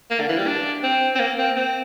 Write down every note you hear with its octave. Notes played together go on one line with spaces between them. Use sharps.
A#3
D3
E3
G3
D4
C4
C4
A#3
C4
C4